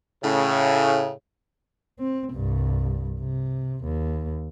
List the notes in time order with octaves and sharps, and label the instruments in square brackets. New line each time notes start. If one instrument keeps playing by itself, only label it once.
[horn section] A2 C#3
[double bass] C4
C2 G2
C3
D#2